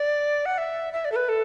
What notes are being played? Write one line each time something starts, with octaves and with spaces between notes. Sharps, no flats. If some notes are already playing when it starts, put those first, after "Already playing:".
Already playing: D5
F#5
E5
E5
D5
A4
B4
A4